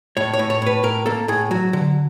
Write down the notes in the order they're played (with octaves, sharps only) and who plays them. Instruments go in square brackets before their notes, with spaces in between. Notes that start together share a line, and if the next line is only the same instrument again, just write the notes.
[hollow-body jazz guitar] A2 C#5
C#5
A2
C#5
A2 B4
A2 A#4
A#3 A4
A2 G#4
F#3 F#4
D3